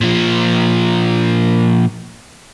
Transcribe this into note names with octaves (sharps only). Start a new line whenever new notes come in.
A#2 F3